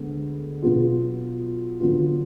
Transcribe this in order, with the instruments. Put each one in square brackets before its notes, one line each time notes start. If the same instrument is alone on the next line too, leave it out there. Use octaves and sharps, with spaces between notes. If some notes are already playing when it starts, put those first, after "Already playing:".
Already playing: [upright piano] D2 D3 G#3 B3
B2 F#3 B3 F4 G#4
D3 F#3 B3 F4